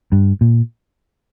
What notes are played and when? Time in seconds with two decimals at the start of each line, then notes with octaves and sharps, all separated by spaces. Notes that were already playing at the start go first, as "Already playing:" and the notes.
0.12 G2
0.41 A#2